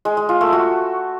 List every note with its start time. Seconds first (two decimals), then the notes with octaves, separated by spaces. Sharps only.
0.05 G#3
0.17 G#3
0.29 F4
0.41 A3
0.53 F#4